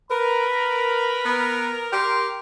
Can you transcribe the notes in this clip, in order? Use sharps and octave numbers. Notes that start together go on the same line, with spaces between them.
A#4 B4 B5
B3
G4 C6